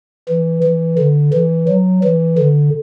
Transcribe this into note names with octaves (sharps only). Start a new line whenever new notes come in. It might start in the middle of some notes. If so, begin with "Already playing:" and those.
E3
E3
D3
E3
F#3
E3
D3